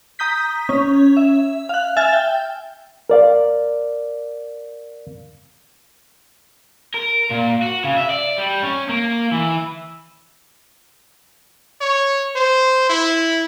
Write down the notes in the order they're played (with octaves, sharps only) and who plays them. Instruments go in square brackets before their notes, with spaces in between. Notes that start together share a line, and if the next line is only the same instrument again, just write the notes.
[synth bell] A#5 D#6 G6 B6
C#4
E5
F5 F#6
E5 G#5 F6 A6
G5
[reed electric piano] A#4 D5 F5
[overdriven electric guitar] A#4
A#2
F#4
C#3
E5
D5
G3
C#4
A#3
E3
[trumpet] C#5
C5
E4